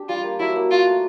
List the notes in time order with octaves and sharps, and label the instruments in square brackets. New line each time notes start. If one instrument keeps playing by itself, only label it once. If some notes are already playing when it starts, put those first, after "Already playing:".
Already playing: [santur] D4 G4
[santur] G3 [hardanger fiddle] F4
[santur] A#3
[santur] F#3 [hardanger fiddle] E4
[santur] A#3
[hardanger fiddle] F4 [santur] F#4
[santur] A3